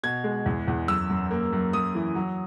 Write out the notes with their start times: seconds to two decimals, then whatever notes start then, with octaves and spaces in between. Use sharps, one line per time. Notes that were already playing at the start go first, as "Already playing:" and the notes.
0.03 B2 G#6
0.24 G#3
0.46 E2
0.68 E2
0.88 F#2 E6
1.10 F#2
1.31 A#3
1.53 F#2
1.73 F#2 D#6
1.95 E3
2.15 F#3